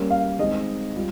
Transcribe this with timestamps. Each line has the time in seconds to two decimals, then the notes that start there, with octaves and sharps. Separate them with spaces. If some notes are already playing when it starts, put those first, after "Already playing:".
Already playing: G3 A#3 C#4
0.10 F5
0.38 D#3 G#3 C4 D#4 D#5
0.96 G3 F4